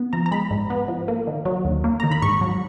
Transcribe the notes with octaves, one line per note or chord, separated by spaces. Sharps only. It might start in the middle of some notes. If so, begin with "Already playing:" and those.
Already playing: B3
F3 A#5
A#5
G#3 B5
G#2
B3
F3
A#3
D#3
F#3
D#2
A#3
D#3 A#5
B5
G#2 C#6
F#3